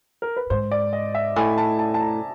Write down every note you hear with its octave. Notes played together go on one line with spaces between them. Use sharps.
A#4
B4
G#2 C5
D5
D#5
E5
A2 G#5
A5
A5
A5
A#5